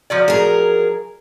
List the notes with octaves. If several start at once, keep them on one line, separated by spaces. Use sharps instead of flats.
F3 F#3 D5
G#4 A#4